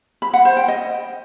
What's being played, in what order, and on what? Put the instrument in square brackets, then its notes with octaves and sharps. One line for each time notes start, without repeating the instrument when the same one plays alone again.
[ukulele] B5
F#5
C5
G5
D#5